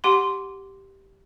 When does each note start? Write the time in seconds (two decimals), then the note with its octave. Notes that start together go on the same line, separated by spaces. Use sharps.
0.04 G4 F#5 C6